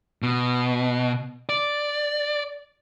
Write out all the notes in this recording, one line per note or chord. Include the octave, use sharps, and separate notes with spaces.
B2
D5